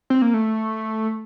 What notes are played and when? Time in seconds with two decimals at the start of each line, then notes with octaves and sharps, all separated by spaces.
0.10 C4
0.22 A#3
0.34 A3